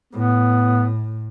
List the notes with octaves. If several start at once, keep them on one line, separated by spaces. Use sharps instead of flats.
A2 B3